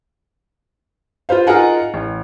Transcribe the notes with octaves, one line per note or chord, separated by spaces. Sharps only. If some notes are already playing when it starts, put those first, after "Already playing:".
F4 B4 C5 F5
D#4 F4 G#4 A#4 F#5 G#5
A1